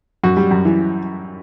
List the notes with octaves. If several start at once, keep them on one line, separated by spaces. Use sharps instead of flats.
F#2 F#4
G3
F#2
E3